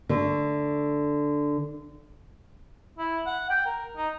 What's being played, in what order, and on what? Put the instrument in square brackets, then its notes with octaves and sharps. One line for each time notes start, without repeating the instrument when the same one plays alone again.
[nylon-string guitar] D3 A3
[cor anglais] E4
F#5
G5
A#4
D#4